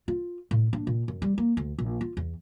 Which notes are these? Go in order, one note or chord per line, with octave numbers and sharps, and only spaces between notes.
F4
A2
D4
A#2
F#2
G3
A#3
D2
A#1
F4
E2